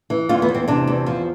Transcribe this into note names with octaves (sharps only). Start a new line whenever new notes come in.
E3
E2 F4
B3
E2
C4
C3 D4
E2
F3